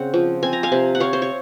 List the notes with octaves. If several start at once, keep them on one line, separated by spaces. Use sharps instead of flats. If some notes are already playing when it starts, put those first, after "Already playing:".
Already playing: C#3 C4 F#5
F3
C4 G#5
A#5
F5 G#5
C3
F#5
C4 C#5 F5
C5
C#5